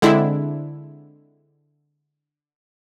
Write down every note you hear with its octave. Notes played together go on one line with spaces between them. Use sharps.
D3 G#3 C4 D4 E4